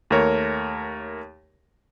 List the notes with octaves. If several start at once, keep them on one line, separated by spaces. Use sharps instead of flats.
D#2 A3 A#4 C#5